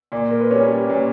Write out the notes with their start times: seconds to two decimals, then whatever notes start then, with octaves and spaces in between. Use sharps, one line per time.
0.12 A#2 D5
0.31 A#4
0.41 B4
0.51 G3 C#4 C#5
0.85 D5
0.89 A#2 C#5